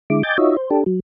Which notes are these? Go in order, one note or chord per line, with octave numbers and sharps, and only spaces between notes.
D3 G#3 E4 D6
D#5 G5 G#5 D6 G6 A6
D#4 F4 F#4 C#5 D#5 E5
C5
D4 G4 A4
F#3